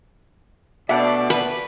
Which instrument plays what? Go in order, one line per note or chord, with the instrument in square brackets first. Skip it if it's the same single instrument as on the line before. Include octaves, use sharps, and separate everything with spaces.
[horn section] B2 D5 [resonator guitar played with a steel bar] A3 D4 [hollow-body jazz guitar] E5 F#5
[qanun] B4